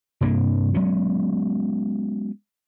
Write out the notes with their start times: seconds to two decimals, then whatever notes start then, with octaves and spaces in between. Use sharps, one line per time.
0.21 G2 C3 A#3 D4
0.74 F#3 G#3 B3 C#4